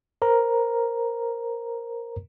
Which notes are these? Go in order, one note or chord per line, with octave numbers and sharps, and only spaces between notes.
A#4 C5 A#5